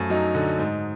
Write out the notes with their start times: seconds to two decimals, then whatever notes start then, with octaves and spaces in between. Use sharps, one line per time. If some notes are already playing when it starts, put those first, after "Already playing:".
Already playing: F#2 F3 A3
0.10 F#3 D#4
0.35 D3
0.59 G#2